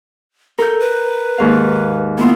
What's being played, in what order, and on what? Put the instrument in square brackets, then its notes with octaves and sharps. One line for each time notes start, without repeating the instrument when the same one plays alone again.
[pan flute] A4 [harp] A#4 G6
[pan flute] B4
[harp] D#2 G#2 F5
[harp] A#3 E4 F4 [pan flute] B3